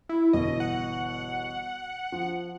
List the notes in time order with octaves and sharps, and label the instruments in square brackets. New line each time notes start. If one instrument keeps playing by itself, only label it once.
[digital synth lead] E4
[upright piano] G1 B2 E3 [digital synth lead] D#5
[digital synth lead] F#5
[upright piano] F3